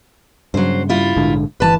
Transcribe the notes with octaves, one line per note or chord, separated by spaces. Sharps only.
G2 C#3 F#3 C5
G3 E4 F4
A#1 G#2 D3
G1 C3 E3 B4 A5